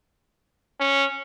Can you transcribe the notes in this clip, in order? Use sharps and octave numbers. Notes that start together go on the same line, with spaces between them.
C#4